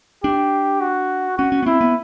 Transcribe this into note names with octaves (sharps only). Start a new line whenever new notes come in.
D4 G4
F#4
C#4 F#4
C#4
B3
C4 E4
B3